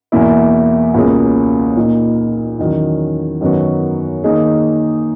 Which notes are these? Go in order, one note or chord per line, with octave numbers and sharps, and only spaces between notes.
E2 B2 A#3 E4
C#2 B2 A#3 C#4 G#4
A#2 A#3 D#4
E2 D#3 F#3 C#4
F#2 D#3 F#3 B3 F#4
D#3 A#3 D#4 G#4